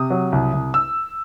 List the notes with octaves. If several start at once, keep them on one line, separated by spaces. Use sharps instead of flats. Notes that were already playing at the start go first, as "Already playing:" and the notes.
Already playing: C3 D#6
F#3
C2
C2
E6